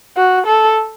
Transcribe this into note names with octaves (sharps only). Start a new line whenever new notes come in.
F#4
A4